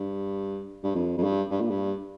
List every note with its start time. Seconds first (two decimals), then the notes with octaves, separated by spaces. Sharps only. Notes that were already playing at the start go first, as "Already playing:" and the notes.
Already playing: G2
0.84 G2
0.95 F2
1.17 F2
1.24 G2
1.50 G2
1.61 A#2
1.70 G2